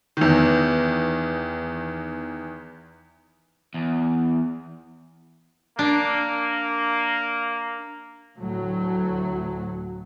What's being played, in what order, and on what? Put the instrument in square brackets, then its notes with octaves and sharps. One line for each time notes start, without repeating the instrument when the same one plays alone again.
[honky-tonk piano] E2 D#3
[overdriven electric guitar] E2
[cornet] A#3 [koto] D4
[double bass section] D2 A2 F#3